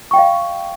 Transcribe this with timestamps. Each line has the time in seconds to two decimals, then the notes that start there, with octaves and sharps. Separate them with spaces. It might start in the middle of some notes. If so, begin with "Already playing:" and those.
0.11 C#6
0.14 G5
0.16 D#5
0.19 F5